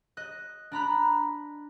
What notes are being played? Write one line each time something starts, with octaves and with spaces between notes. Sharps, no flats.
D#5 F#6
D4 A#5 B5 F#6